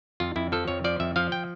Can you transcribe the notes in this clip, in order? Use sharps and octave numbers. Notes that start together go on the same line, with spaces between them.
F2 F4
F2 E4
F3 A4
F2 C#5
F3 D5
F2 E5
F3 F5
G5